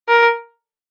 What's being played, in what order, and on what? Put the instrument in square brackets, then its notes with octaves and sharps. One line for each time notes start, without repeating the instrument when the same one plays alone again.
[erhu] A#4